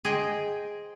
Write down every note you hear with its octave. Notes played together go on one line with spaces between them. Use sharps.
G#4 C5 D#5 G5